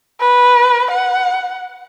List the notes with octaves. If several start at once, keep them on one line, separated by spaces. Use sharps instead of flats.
B4
F#5